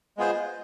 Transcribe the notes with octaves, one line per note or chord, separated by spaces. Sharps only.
G#3 B3 F4 G#4 C5